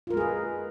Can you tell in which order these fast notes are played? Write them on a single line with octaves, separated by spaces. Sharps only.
F4 A#4 G#3 G#4 B4